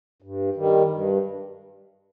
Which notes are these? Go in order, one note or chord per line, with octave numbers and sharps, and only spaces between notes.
G2
D#3 G3
G2